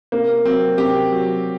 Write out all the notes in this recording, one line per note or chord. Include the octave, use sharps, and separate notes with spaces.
C3 A#3
F#3 C4
C3 G4
F#3